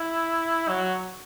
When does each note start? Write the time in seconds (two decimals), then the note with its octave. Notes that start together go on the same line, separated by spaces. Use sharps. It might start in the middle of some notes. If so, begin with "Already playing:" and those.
Already playing: E4
0.69 F#3